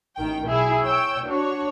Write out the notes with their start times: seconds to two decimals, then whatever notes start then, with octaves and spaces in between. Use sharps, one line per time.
0.16 A1 D#3 G5
0.45 B1 E4 G#4
0.84 C#5 G5 E6
1.24 D4 F#4 C#5